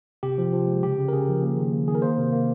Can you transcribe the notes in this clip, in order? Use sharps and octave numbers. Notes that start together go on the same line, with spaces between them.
C3 G4
F3
F3
G#3
C#3 G4
C#3
A#4
C#3 G#4
F3
A#3
D#3
A#3
D#3 G#4
A#4
A#3 C5
C3
A#3